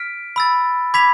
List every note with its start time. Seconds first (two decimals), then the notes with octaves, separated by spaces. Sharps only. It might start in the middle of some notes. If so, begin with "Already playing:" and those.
Already playing: F6 B6 D7
0.36 B5 E6 A6
0.94 B5 D6 G#6 B6 F7